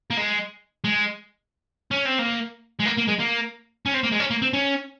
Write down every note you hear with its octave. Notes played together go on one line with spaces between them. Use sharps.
A#3
G#3
G#3
C#4
C4
A#3
G#3
A#3
A#3
G#3
A#3
C#4
C4
A#3
G#3
C#4
A#3
C4
C#4